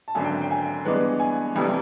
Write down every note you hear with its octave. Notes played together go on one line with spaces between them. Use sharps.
A5
G#1 F#2 D3 G#5
G5
G5
G#5
G2 E3 G#3 B3 D4
G#5
F1 F2 C3 E3 G3